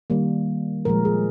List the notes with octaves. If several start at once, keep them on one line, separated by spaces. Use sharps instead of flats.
D#3 G3 A#3
A#2 F3 G#3 A#4
G#4